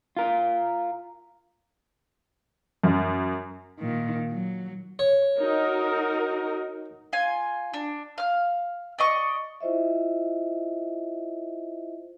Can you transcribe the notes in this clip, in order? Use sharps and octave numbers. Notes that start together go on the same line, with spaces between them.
F4 A#4
F#2
A#2 D#3
F#3
C#5
D#4 F#4 A#4
F4 G#5
D4
F5 F6
D5 D#5 C#6
E4 F4 C5 D#5 E5